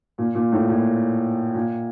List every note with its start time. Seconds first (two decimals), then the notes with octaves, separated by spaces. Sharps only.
0.18 A#2
0.35 A#2
0.52 A2
0.69 A#2
1.55 A#2